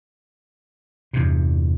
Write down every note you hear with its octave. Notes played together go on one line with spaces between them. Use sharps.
E2 G2 C3